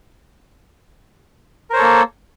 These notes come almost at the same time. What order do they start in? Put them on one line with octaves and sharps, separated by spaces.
A#4 C5 C#5 A4 A#3